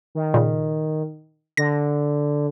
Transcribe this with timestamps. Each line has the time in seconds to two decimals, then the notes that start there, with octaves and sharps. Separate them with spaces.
0.15 D#3
0.34 A#2 C#3
1.57 D3 A#6